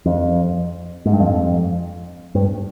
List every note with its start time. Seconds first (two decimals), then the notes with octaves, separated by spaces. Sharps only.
0.06 F2
1.05 G#2
1.13 G2
1.20 F2
2.35 G2